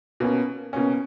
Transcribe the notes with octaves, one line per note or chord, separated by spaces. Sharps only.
B2 A#3 C#4
B2 A#3 C#4